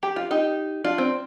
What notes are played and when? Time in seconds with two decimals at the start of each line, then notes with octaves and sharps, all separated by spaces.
0.03 G4
0.16 F4
0.31 D#4 G4
0.84 D4 F4
0.98 C4